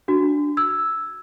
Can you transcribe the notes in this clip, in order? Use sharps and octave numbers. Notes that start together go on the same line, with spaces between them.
D4 F#4
E6 G#6